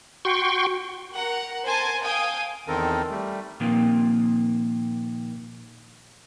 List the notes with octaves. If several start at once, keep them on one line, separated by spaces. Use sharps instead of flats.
F#4 G5 C6 C#6
A#4 F#5 A#5
A#4 C5 G#5 A5
F5 G5 G#5 D#6
E2 D#3 C4 A4 A#4
G3 A3
A#2 D#3 F3 A#3 C4